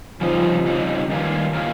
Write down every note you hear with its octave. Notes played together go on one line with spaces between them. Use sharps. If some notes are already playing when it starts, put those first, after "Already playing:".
F2 C#3 F3 G3 D#4
F2 C#3 G3 D#4
G2 D#3 A#3 C#4 F4
D#3 A#3 C#4 F4